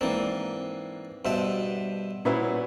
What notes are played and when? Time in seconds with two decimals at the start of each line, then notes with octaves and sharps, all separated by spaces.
0.01 G#2 E3 A#3 C4 D4
1.25 G2 B2 C5 E5 A5
2.25 A#2 C#4 E4 F#4 B4 C5